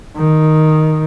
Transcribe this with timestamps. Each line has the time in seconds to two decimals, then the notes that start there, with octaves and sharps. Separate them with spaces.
0.17 D#3